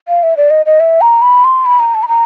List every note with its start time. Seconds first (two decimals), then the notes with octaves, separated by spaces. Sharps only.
0.08 F5
0.23 E5
0.37 D5
0.50 D#5
0.66 D#5
0.80 E5
1.01 A#5
1.22 B5
1.44 C6
1.65 B5
1.80 A#5
1.95 A5
2.03 B5
2.08 A#5